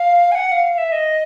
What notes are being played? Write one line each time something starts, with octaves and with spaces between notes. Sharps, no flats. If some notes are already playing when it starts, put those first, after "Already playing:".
Already playing: F5
G#5
F#5
F5
F5
E5
D#5